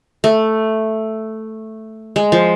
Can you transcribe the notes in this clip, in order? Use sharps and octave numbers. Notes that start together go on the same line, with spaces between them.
A3
G#3
F3